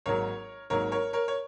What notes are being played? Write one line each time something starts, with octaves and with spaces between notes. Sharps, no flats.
G#1 G#2 D#3 F#3 A#3 A#4 C#5
G#1 G#2 D#3 F#3 A#3 A#4 C#5
A#4 C#5
A#4 C#5
C#5